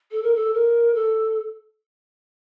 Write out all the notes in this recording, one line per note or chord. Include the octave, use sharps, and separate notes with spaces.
A4
A#4
A4
A#4
A4